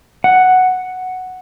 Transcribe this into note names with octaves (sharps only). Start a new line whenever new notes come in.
F#5